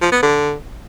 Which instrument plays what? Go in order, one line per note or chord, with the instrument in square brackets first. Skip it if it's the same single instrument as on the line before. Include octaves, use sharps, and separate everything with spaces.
[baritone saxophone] F3
B3
D3